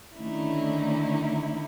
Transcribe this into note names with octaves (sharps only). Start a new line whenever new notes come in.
D3 D#3 A3 C#4 D#4 E4